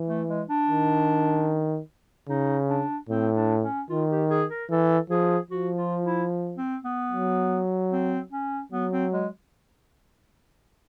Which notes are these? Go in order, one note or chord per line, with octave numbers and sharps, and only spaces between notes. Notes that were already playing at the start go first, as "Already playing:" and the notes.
Already playing: E3
A3
G#3
D4
D#3
C#3 D#4
D4
A2 C4
D4
C#4
D#3 F4
G4
G#4
A#4
E3 A4
F3 G#4
F3 F#4
F4
E4
C4
B3
F#3
C4
C#4
F#3 B3
C4
G#3